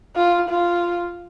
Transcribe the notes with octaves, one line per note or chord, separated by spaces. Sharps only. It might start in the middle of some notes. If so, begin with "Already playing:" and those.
F4
F4